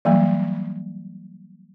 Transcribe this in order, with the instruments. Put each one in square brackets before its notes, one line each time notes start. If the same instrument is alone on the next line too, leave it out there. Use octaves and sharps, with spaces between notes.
[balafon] E3 F#3 G3 A#3